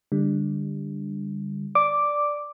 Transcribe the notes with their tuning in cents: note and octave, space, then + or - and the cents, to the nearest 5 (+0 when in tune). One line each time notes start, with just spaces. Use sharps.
D3 +0 G3 +25
D5 +0 D6 +0